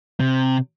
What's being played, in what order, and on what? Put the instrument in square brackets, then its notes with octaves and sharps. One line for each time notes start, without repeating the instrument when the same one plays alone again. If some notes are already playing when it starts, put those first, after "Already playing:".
[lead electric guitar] C3